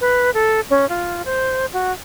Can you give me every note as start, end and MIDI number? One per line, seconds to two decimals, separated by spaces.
0.01 0.31 71
0.34 0.61 69
0.70 0.88 61
0.89 1.22 65
1.25 1.66 72
1.73 1.92 66